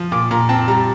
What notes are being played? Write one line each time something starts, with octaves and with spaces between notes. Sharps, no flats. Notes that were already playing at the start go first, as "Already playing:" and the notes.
Already playing: F3
A#2 D6
A#2 A#5
C4 A5
G3 A#5